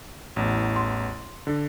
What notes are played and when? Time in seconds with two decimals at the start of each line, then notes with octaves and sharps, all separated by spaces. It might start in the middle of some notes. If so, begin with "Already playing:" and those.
0.36 A1 E2
0.76 C6
1.47 D3